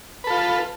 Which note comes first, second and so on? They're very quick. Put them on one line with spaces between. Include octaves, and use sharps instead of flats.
B4 A4 F4